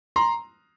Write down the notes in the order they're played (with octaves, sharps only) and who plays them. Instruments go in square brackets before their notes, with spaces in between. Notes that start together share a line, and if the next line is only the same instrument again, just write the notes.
[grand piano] A#5 C6